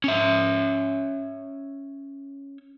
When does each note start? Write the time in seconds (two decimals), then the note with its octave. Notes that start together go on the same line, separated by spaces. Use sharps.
0.04 C#4 E5